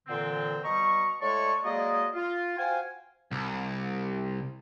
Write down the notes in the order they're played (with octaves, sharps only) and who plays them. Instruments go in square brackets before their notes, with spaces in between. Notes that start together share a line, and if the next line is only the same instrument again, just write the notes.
[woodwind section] A#2 D3 E3 C4
B2 G3 D#5 A#5 C#6
A2 G#3 C#5 D5 A5 C#6
F#3 G#3 A#3 G#4 D5 D#5
F4
F#4 C5 F5 G5 G#5
[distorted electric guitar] C2